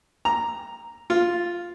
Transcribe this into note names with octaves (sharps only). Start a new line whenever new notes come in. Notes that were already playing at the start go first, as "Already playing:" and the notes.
A#5
F4